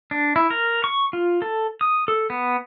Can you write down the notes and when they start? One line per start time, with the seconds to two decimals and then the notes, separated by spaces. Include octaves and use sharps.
0.11 D4
0.36 E4
0.50 A#4
0.84 C#6
1.13 F4
1.42 A4
1.81 D#6
2.08 A4
2.30 B3